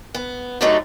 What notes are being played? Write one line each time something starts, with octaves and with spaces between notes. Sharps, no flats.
B3
F#2 D3 F#3 G3 A3 D#4